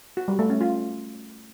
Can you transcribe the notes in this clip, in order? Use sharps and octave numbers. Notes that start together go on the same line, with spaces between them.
F#4
G3
A3
C#4
F4